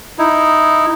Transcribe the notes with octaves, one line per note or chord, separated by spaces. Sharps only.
D#4 E4